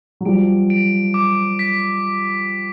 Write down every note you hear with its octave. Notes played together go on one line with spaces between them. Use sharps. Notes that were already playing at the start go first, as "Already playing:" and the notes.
F#3
F3 G3 D7
D7
D6
B6